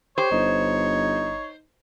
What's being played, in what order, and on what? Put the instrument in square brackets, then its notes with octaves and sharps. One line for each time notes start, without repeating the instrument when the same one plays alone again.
[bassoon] G4 [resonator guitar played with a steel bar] C5 [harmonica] C#5
[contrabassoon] G1 [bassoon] D#4